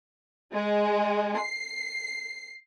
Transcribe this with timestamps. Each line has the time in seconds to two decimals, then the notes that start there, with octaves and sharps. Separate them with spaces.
0.53 G#3
1.37 C7